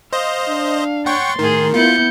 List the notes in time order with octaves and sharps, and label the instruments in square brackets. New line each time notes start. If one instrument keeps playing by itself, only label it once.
[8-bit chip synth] C5 D#5 [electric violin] F5
[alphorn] D4
[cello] C#5 [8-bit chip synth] F#5 G5 C#6 [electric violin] C6 A6
[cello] A2 G#4 [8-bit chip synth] D#3 [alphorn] A#4
[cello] B3 E4 [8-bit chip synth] F4 [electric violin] G6 C#7